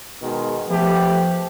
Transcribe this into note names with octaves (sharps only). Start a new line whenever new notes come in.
B2 D#3 G#3
F3 A3 B3 G4